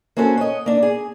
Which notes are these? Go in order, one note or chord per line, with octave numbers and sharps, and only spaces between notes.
A#3 C4 C#4 F#4 A4
C#5 D#5
A#3 D4
G#4